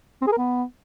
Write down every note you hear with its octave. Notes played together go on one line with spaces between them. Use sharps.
C4
G#4
A#4
B3